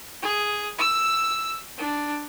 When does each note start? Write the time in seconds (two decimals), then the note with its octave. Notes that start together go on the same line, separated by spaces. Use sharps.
0.22 G#4
0.78 E6
1.78 D4